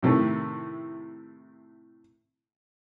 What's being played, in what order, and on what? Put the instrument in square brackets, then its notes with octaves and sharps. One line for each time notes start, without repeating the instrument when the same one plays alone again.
[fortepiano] A2 C3 D#3 A3